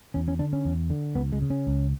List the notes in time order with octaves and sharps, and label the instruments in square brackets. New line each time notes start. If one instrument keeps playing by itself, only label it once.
[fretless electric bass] E2 C#4
C#4
D3 D4
C#4
E2
D3
C#2 B3
G#3
C#3
C#4
C#2